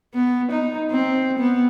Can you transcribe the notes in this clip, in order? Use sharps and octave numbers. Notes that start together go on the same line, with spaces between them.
B3
D#4
C4
B3